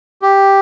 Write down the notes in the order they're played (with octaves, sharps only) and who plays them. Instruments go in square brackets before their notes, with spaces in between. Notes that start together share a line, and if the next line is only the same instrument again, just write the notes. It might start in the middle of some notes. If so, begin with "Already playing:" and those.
[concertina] G4